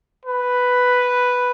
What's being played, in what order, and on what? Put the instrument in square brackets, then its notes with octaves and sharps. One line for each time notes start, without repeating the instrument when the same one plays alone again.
[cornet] B4